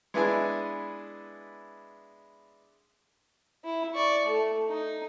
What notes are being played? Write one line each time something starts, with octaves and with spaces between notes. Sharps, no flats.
G#3 B3 D4 E4 B4 G#5
E4
D5 C#6
A3
D#4